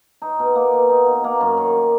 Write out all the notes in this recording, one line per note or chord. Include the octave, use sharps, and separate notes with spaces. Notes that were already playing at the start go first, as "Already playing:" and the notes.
D#4
B2
A#3
B2
D#4
B2
A#3
F#2
D#3